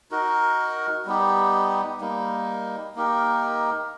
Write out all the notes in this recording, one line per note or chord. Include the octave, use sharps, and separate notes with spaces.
D#4 F#4 A#4
G3 B3 D#4 G4
G3 A#3 D#4
A#3 D#4 G4 A#4